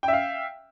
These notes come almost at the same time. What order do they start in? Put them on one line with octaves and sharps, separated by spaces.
G5 E5 F5